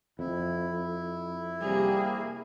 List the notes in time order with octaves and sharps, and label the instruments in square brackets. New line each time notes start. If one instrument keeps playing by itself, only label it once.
[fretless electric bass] F2 [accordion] E4
[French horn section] C3 G3 [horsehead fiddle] A#3 G#4